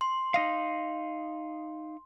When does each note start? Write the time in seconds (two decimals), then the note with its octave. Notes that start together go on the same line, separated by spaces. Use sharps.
0.01 C6
0.34 D#4 D#5 F5